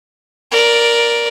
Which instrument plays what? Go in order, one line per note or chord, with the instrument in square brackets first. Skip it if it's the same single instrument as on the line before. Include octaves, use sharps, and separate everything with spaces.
[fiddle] A#4 D5